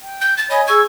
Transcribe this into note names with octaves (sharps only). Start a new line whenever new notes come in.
G5
G6
A6
C#5 D#5 G#5 B5
G#4 C#6 E6 G#6